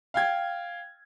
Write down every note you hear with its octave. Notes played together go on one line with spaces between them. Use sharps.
F5 G5 G#6